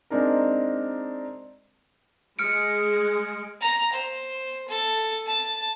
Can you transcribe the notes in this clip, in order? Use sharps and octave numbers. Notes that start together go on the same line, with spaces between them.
G#3 C4 D4 D#4 A#4
G#3 F6 C#7 D7
A#5
C5
A4
A5